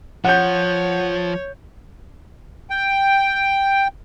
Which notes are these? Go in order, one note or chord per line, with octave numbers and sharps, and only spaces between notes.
F3 C#5 F#5 G6
G5